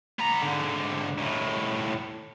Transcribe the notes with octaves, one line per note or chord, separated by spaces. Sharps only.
B3 A#5
G#2 D3
D#2 A2